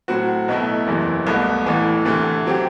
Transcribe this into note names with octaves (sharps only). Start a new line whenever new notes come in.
A2 F#3 C4 F#4
B1 B2 A3 E4
F#1 E2 C3 E3
C2 B2 A3
A1 A2 E3 A3
D2 C3 E3 A3
F#3 C4 G4